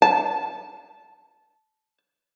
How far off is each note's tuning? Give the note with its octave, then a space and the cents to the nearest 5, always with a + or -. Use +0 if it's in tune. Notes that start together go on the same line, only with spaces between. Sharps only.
A5 -15